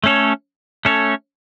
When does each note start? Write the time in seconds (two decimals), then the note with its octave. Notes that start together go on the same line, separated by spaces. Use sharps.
0.04 A3 C#4 A4 C#5
0.85 A3 C#4 A4 C#5